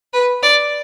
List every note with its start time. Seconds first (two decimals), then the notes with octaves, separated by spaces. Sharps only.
0.13 B4
0.42 D5